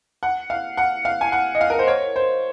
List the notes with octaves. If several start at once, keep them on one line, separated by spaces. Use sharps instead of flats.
F#5
F5
F#5
F5
G#5
F#5
D#5
F5
A#4
C5
C#5
C5